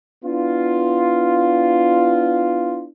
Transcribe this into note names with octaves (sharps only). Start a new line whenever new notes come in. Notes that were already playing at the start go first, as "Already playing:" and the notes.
B3 D4 E4 F4